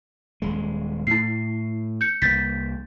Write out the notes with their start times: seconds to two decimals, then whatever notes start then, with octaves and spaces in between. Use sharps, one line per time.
0.42 D#1 G#3
1.07 A2 E4 C7
2.01 G6 C#7
2.22 C2 A#3 G6 A6 B6